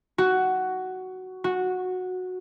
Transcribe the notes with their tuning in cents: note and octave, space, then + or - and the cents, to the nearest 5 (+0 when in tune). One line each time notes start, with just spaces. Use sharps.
F#4 +10
F#4 -10